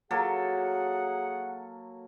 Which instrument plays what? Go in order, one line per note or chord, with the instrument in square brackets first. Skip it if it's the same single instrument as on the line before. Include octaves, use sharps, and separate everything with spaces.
[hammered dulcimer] F#3 A#3 A4 [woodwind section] G#4 F#5